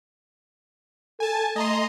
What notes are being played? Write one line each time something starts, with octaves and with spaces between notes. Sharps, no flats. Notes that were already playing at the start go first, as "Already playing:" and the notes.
A4 G#5 A5
A3 D#5 A#5 C6